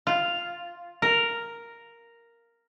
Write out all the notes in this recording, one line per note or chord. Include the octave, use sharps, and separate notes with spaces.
F4
A#4